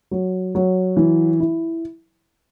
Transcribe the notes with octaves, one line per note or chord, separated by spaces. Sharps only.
F#3
F#3
E3
E4